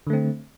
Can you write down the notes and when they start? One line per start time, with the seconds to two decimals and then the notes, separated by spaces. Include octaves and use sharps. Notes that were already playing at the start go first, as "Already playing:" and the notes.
0.07 D3
0.10 A3
0.13 C4